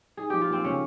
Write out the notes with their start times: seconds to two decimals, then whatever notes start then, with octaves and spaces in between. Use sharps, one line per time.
0.17 D#4 G#4
0.30 F3 G4
0.41 F4
0.50 A#3 C4
0.64 C#3 C#4